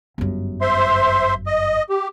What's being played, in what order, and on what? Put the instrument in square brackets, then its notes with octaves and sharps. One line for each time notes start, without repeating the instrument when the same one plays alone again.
[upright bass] G1 F#2
[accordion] C5 E5 C6
D#5
G4